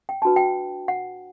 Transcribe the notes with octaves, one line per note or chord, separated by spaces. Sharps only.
G5
D4 F#4 B4 A5
G5
F#5